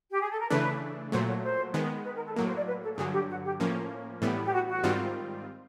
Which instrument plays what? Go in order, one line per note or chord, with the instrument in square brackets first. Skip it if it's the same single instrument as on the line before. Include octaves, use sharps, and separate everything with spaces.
[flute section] G4
G#4
A4
A#4
[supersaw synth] C#3 E3 A3 D4 [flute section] B4
[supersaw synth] A#2 F#3 A3 [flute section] C5
[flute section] C#5
C5
[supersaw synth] D#3 G#3 B3
[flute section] B4
A#4
A4
[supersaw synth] A2 F#3 A#3 [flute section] A#4
[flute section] C5
D5
B4
A4
A4
[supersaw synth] G2 D3 F#3 [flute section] G#4
[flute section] G4
F#4
G4
[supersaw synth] A2 F3 A#3 C#4
A2 E3 G3 B3
[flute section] G4
F#4
F#4
[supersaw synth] G#2 D#3 G3 C4 F4